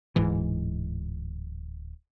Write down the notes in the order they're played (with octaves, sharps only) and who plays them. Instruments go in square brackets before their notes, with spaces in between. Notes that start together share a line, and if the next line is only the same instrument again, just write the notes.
[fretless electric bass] D1 G#2 E3